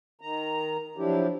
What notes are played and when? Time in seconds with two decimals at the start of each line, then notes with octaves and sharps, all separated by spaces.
0.21 D#3 A#5
0.97 F3 F#3 D4 E4 G4